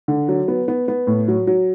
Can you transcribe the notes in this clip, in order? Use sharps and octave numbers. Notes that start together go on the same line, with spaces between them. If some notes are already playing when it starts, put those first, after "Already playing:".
D3
F#3
B3
B3
B3
A2
F#3
F#3